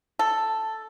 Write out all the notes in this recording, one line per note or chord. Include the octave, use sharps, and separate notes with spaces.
A4